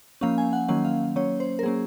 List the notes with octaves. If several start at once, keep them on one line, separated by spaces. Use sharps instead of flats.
F3 A#3 C#4 F5
G#5
F#5
D#3 F#3 A#3 C#4 F#5
F5
F#3 A#3 C#4 C#5
C5
A#4
F#3 A#3 C#4 G#4